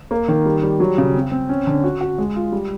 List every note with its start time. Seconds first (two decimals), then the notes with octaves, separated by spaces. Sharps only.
0.11 A#3
0.28 D#3
0.46 G3
0.63 G3
0.80 F#3
0.98 C#3
1.15 C4
1.31 C4
1.49 C#4
1.67 D3
1.84 F#4
2.01 F#4
2.18 G#3
2.36 F4
2.52 G3